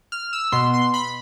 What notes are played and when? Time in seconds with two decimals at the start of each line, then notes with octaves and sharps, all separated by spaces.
0.12 F6
0.33 E6
0.52 B2 B3 C6
0.74 C6
0.94 B5